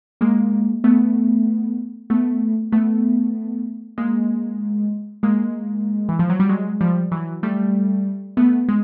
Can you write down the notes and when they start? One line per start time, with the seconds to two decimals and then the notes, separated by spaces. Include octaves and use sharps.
0.21 G#3 A#3
0.84 A3 B3
2.10 A3 B3
2.72 A3 B3
3.98 G#3 A#3
5.23 G#3 A#3
6.09 E3
6.19 F3
6.29 F#3
6.40 G3
6.49 F#3 G#3
6.81 F3 G3
7.11 E3 F#3
7.43 G3 A3
8.37 A3 B3
8.68 G#3